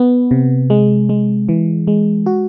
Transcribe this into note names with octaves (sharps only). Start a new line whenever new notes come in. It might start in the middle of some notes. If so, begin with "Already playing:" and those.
Already playing: B3
C3
G#3
G#3
E3
G#3
F#4